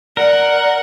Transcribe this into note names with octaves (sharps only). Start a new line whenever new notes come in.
A#4 D5 F#5